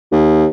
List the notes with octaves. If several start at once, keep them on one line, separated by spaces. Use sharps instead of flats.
D#2